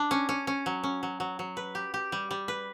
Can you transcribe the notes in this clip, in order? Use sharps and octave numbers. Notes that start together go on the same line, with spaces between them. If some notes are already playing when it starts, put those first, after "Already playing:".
Already playing: D4
C#4
C#4
C#4
F#3
C#4
F#3
F#3
F#3
B4
G4
G4
G3
G3
B4